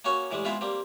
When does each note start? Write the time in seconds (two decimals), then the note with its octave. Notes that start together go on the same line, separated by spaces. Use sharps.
0.05 A#3 C#4 F#4 C#5
0.31 A2 E3 G3 G#3
0.45 F3 G#3 B3 C4 E4 F4
0.61 G3 A#3 C4